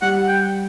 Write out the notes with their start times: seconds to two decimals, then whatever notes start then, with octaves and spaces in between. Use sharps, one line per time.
0.01 G3 F#5
0.28 G5